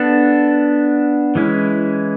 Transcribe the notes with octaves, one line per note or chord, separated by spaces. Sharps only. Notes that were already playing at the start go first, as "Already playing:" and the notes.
Already playing: B3 D4 A4
E3 G#3 C#4 E4